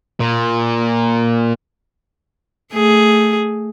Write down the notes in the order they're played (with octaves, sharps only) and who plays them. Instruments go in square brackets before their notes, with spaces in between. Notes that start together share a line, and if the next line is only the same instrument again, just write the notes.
[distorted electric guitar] A#2
[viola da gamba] A3 G#4